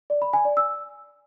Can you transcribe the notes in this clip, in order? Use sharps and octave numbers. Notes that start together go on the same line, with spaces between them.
D5
B5
G#5
D5
E6